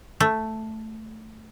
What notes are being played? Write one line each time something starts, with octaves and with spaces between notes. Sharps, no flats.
A3